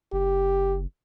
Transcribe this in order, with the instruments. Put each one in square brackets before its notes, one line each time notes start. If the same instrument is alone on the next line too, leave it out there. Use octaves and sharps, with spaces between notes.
[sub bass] F#1 [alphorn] G4